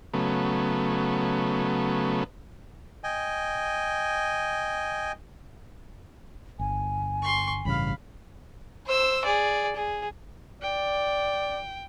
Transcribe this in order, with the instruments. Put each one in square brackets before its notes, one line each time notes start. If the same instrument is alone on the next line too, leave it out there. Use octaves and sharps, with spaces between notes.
[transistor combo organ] C#3 F#3 A3 B3
[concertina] D#5 G5 G#5
[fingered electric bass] G1 [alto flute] G#5
[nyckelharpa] C6 C#6
[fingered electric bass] A1 G2 C#3 [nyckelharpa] F5 B5
[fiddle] C5 E6
G#4 D5
G#4
[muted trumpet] D5 [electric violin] G5